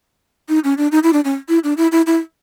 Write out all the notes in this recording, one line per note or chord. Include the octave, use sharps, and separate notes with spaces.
D#4
C#4
D4
D#4
E4
D4
C#4
E4
D4
E4
E4
E4